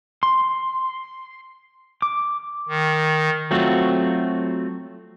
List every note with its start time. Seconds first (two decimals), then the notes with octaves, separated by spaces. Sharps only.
0.23 C6
2.02 D6
2.69 D#3
3.51 F#3 A3 C4 F4 F#4